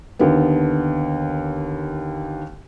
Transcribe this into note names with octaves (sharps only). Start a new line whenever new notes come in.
D#2 D3 B3